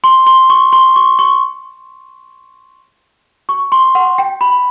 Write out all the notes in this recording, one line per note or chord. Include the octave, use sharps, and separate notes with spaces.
C6
C6
C#6
C6
C#6
C#6
C#6
C6
F#5
G5
B5